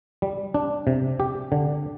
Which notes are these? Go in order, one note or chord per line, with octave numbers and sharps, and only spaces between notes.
G3
D4
C3
G4
D3